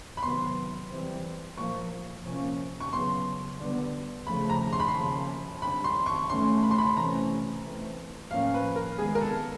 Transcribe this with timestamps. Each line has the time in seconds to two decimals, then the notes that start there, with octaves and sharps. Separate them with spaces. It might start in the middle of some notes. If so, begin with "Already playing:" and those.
0.17 B5
0.22 C3 D#3 F#3 B3 C6
0.90 E3 G3 C4
1.57 A#2 F3 A#3 C#6
2.25 C3 F3 A#3 C#4
2.80 C#6
2.92 C#3 F#3 B3 C6
3.60 D3 G3 B3
4.27 C#3 F3 A3 B5
4.50 A#5
4.73 C6
4.80 B5
4.88 C6
4.95 C#3 F3 A#3 C#4
5.62 D3 G3 C4 B5
5.84 C6
6.06 C#6
6.29 E3 A3 C#4 C6
6.63 B5
6.71 C6
6.78 B5
6.96 C3 E3 A3 C#4 A#5
7.63 E3 A3 C4
8.31 A2 F3 A#3 C#4 F5
8.54 B4
8.76 A#4
8.98 D#3 G#3 B3 G#4
9.15 A#4
9.21 A4